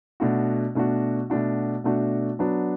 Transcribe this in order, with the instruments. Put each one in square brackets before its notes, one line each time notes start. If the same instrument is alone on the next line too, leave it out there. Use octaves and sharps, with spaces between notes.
[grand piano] B2 A3 D4 F#4
B2 A3 D4 F#4
B2 A3 D4 F#4
B2 A3 D4 F#4
F#3 B3 D4 F#4